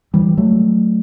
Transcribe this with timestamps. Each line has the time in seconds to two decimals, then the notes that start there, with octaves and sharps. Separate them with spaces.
0.14 E3 G3
0.37 F#3 A3